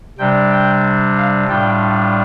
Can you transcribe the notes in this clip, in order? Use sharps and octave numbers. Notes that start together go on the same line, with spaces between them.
C3 G3 D4 G5
G5
F5
A2 G3 D4 F4 G5